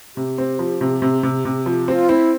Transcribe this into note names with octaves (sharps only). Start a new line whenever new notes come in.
C3 G4
C4
F3
C3
C3
C3
C3
F3
C4 F4 G4
C4 E4